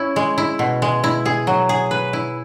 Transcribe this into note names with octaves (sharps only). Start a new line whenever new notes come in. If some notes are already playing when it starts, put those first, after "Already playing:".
Already playing: C#4 E4
G#3
E4
B2
G#3
E4
G#4
F#3
G#4
B4
E4